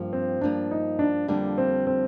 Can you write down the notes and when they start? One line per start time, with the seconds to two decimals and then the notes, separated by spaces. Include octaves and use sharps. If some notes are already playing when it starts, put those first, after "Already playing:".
Already playing: G2 F3 A#3
0.13 C4
0.41 G2 F3 A#3 D4
0.71 D#4
0.99 D4
1.28 F2 D3 G3 A#3 D4
1.58 C4
1.87 C4